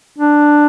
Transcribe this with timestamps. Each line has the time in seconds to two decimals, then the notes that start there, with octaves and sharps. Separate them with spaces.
0.18 D4